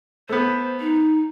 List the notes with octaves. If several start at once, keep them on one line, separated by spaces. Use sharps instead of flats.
A3 B3 C5
D#4